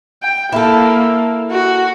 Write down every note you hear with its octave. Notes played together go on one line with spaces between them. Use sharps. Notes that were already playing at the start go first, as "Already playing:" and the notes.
G5
A#3 E4 A4
F#4